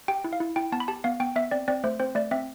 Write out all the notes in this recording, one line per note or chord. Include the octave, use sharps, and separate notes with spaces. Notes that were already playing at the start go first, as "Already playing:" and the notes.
G4 G5
E4
F5
E4
E4 G5
B3 A5
B5
G4 A5
B3 F5
B3 G5
B3 E5
C4 D5
C4 D5
A3 C5
C4 C5
A3 D5
C4 E5